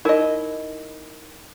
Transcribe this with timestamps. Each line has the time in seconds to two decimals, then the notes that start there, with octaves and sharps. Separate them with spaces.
0.05 D#4 E4 A#4 D#5